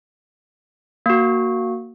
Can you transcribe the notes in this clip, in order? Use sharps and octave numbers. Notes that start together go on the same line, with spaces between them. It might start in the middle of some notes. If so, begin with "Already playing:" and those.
A#3 F#4